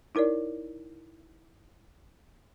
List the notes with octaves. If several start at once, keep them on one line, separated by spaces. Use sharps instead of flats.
D#4 E4 A#4 C#5 D5